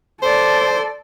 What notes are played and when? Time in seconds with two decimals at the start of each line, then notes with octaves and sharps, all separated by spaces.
0.22 A4 C5 D5